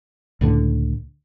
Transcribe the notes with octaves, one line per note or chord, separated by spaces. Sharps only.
C#2 A2 D3